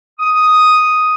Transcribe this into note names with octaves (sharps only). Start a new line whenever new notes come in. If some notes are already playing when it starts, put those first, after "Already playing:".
D#6